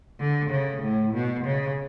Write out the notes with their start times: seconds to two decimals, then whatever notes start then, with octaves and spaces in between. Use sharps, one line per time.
0.20 D3
0.51 C#3
0.83 A2
1.14 B2
1.45 C#3